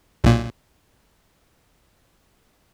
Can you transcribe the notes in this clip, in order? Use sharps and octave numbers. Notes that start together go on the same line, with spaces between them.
B1 A#2